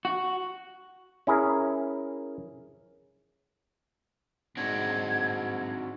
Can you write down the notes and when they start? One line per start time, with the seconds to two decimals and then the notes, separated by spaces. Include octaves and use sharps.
0.05 F#4
1.27 C#4 E4 G#4 A#4
4.57 G#2 C4 D4 F#4 G#6